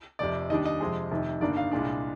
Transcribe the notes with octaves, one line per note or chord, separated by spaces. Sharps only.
F1 F2 C3 D5
D#2 D#3 G3 D4 D#5
D#5
F2 C3 F3 G#3
F1 F2 C3 D#3
G1 G2 D#3 A#3 D4 D5
F5
C2 A#2 G#3 D4